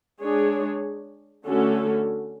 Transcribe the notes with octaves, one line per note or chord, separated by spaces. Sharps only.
G#3 D4 G#4 C#5
D3 A3 C#4 F#4 A4